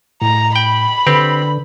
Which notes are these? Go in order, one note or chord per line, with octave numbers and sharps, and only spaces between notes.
A2 A#5
G5 B5
D3 C4 G4 B4